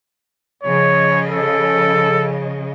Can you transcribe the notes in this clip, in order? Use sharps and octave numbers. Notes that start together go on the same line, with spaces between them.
C#3 F3 C#5 D#5
A4